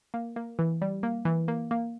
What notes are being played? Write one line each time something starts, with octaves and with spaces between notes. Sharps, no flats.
A#3
A#3
E3
G3
A#3
E3
A#3
A#3